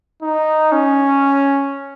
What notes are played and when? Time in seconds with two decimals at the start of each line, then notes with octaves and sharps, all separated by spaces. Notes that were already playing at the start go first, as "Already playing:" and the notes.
0.22 D#4
0.72 C#4